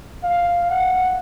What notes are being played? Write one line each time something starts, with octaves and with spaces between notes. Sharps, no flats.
F5
F#5